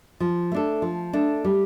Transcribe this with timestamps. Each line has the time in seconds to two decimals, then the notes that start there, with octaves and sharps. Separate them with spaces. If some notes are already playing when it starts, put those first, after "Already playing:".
0.20 F3
0.52 A3 D4 A4
0.82 F3
1.13 A3 D4 A4
1.44 G3